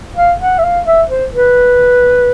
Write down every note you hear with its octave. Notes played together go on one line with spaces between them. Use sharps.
F5
F#5
E5
F5
E5
C5
B4